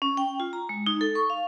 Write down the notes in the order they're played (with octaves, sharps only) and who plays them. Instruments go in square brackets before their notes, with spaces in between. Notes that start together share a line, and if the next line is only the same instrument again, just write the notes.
[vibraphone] C#4
G5
F4
A#5
G#3
D#4
A4
C#6
F5